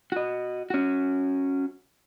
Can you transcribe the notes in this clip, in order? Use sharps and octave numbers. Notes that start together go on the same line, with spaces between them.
F#4 D#5
C#4 F#4